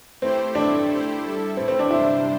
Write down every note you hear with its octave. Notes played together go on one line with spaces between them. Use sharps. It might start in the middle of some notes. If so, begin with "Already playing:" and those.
A3 C4 E4 G4 C5
A2 A3 C4 D4 E4 A4
A3 E4 G4 C5
G3 E4 A4
A2 A3 C4 E4
C4
D4
C3 G3 D4 E4 C5